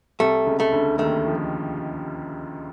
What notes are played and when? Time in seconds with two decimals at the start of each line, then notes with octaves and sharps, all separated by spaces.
0.20 C2 C3 A3
0.46 C#2 C#3
0.60 A3
0.72 D2 D3
0.99 D#2 D#3 A3
1.28 F3